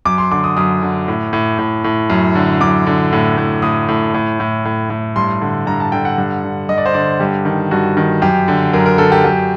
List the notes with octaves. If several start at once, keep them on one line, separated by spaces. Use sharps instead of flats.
F#2 D6
C6
D3 D6
D#6
F#2 D#6
D3
A2
A2
A2
A2
F#2
D3
F#2 D6
D3
A2
A2
A2 D#6
A2
A2
A2
A2
A2
G2 C6
D3
G2 A#5
A5
D3 G5
F#5
G2
D3
G2 D#5
D5
C5
D3 D5
G2 G4
D#3
G2 F#4
D#3
F#2 G4
D3
F#2 A#4
A#4
D3 A4
G4
F#2 G4